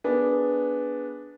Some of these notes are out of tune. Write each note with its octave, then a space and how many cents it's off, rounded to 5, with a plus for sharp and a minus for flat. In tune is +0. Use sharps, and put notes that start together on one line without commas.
B3 +0 D4 -5 G#4 +0